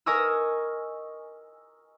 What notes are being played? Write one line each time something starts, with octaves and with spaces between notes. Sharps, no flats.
A#4 D#5 G#5 C#6 D#6 E6